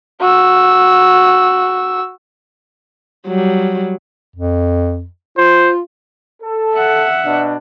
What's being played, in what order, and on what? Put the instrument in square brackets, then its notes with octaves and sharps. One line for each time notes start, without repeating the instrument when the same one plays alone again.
[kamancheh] F#4 E6
[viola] F#3 G3
[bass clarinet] F2
[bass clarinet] F4 [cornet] C5
[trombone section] A4
[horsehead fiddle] E5 F#5
[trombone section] B2 D4